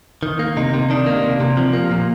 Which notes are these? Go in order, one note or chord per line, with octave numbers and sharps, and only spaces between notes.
D#3
A#3
C3 D#4
C3
D#3 D4
A#3
C3
C3
F3
A#3
A#2